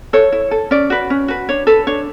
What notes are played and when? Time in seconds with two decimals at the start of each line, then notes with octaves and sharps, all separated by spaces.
0.13 A4 C#5
0.32 E4
0.51 A4
0.71 C#4 D5
0.90 F#4 B4
1.10 C#4
1.28 F#4 B4
1.49 D4 C#5
1.67 A4 B4
1.87 D4 C#5